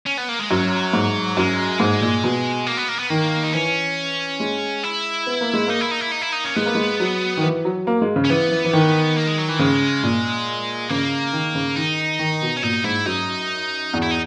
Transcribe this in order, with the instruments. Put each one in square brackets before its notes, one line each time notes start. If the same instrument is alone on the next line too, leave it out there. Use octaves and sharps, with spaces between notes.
[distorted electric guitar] C#4
B3
A#3
G#3
[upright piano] F#2 [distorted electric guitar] F#3
[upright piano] G#2
[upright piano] F#2 [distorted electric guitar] G#3
[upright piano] G#2
A#2
B2
[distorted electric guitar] A#3
B3
A#3
B3
[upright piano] D#3 [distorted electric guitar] A#3
[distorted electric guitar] D#4
[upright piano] E3 [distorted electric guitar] C#4
[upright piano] G#3
[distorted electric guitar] E4
[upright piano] B3
A#3
G#3
[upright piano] A#3 [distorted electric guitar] D#4
[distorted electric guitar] E4
D#4
E4
D#4
E4
D#4
C#4
[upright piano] G#3 [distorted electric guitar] B3
[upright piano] A#3
G#3
F#3
D#3
E3
F#3
A#3
G#3
C#3
[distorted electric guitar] C#4
[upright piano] E3 [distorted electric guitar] B3
[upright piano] E3
E3
D#3
[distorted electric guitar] A#3
G#3
F#3
E3
[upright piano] C#3 [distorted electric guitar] G#3
[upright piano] A#2
[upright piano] C#3 [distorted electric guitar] A#3
[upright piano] D#3
C#3
[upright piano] D#3 [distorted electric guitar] D#4
[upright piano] D#3
B2
[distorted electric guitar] C#4
[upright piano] A#2 [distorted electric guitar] D#4
[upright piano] G#2 [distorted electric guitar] E4
[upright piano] F#2 [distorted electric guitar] D#4
[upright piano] E2
[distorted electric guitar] E4
D#4